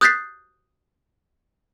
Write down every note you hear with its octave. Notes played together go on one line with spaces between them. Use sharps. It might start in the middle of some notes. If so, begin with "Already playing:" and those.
D#6 F#6 G6 A6 B6 C7